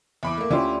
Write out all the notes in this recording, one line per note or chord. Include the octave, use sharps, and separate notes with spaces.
E2 E5 B5 D6 D7
A3 A#3
D2 C#4 E4 F4 G4 D5 C6